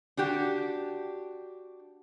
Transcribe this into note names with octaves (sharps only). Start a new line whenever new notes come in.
D4 F#4 G4